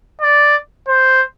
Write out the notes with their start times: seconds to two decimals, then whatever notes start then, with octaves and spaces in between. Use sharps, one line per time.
0.21 D5
0.88 C5